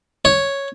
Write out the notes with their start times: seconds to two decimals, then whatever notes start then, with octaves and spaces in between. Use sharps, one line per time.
0.25 C#5